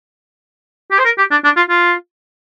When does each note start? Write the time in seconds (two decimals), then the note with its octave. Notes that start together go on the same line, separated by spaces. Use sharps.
0.91 G4
0.99 C5
1.05 A#4
1.18 G4
1.31 D4
1.44 D4
1.57 F4
1.70 F4